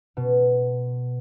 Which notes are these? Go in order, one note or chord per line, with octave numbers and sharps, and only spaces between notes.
B2